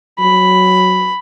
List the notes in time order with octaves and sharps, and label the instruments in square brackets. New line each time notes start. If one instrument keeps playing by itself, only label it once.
[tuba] F#3 [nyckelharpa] B5